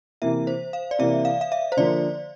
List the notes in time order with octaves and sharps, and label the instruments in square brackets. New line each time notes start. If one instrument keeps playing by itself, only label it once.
[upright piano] C3 E3 A#3 [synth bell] E5
[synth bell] C5
F5
D5
[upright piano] C3 E3 A#3 [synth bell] E5
[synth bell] F5
F5
E5
C5
[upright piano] D3 F3 A#3 [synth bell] D5